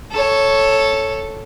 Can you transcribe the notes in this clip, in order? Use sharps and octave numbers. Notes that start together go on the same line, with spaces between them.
A4 C#5